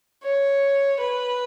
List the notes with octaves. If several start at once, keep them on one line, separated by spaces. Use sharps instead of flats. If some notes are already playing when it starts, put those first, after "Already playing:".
C#5
B4